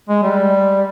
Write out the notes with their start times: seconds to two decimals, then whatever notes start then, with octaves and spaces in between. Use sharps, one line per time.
0.09 G#3
0.23 G3